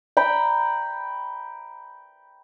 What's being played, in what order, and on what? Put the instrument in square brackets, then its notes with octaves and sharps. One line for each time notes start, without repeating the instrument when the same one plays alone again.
[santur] G5 A#5 B5